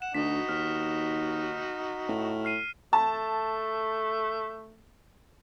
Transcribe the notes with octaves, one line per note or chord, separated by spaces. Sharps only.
F#5 E7
D2 D#4 F#4 B6
D#2 F6
A2
F6 C7 D#7
A3 A5